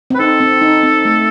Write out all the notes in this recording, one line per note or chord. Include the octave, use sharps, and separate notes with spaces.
C4
B4
D#4 A4
C4
D#4
C4
A3